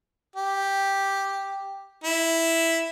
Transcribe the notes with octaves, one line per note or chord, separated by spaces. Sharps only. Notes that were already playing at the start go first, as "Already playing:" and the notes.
G4
E4